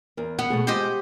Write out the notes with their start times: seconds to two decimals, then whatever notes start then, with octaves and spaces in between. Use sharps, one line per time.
0.17 E2 A#4
0.39 B3 F#5
0.50 B2 A3 G#4
0.67 G#3 F4 G4 C5 D#5